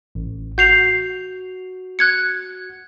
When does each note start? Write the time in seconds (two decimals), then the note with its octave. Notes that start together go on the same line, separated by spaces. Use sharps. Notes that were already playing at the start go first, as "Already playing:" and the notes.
0.15 A1
0.58 F#4 G6 C7 F7
1.99 F#6 G#6 C#7